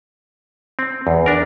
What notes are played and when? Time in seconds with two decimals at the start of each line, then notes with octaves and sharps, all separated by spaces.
0.79 C4
1.07 E2
1.26 D4 A#4